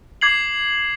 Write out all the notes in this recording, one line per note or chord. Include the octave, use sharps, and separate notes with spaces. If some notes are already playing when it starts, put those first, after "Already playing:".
D6 G#6 C7 F#7